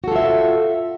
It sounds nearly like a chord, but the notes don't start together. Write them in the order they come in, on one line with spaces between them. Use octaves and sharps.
F#4 A4 F4 E5